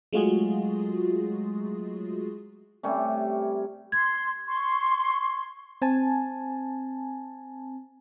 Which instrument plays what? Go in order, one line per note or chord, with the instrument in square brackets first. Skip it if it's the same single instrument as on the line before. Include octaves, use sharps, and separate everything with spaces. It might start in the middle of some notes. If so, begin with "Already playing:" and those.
[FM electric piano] F#3 G#3 A3 F4 F#4 G#4
[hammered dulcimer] C3 G3 A3 C#4
[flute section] C6 [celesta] G#6
[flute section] C6 C#6
[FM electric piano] C4 G#5 A5